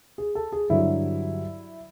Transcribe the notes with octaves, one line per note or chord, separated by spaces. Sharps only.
G#4
A4
G#4
G2 D3 F#3 E4